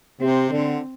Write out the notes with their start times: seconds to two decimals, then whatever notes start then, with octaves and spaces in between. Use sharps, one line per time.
0.21 C3 C4
0.51 D3